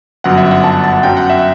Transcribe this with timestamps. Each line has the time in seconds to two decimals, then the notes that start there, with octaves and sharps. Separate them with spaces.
0.24 G1 F#2 F#3 F#5
0.37 E5
0.51 F#5
0.64 A5
0.84 A5
1.03 F#2 F#3 G5
1.17 F#5
1.30 E5